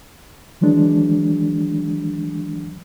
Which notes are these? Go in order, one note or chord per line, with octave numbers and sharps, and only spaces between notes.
D#3 E3 F#3 G#3 D4